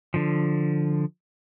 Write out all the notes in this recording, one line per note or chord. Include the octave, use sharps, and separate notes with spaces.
D3 F3